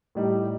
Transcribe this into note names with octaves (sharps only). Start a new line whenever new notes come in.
A2 G3 D#4 G4